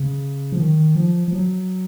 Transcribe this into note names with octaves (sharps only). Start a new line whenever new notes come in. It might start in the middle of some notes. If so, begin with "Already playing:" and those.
Already playing: C#3
F3
D#3
F3
F3
F#3